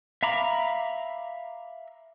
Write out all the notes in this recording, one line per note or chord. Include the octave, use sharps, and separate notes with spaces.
E5 F5 A#5 B5 D6